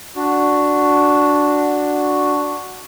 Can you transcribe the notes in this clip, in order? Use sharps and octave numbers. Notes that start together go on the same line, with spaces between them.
D4 F#4